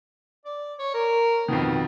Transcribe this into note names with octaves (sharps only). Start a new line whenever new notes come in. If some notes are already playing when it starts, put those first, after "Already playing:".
D5
C#5
A#4
F2 B2 D#3 B3